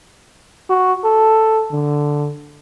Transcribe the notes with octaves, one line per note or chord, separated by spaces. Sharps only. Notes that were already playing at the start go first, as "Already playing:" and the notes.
F#4
A4
D3